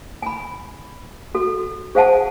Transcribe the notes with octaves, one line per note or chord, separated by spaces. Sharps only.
G#5 B5
F#4 A4
G#4 C5 F5 F#5 G#5 A5